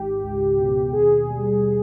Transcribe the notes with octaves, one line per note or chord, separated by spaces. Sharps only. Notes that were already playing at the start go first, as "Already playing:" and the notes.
Already playing: G#1 G#2 G4
C#2
B2
D#2 G#4
G3